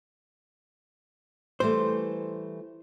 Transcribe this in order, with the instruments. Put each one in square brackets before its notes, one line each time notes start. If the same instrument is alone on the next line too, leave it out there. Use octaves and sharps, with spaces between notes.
[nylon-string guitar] E3 G3 A3 [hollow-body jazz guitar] C5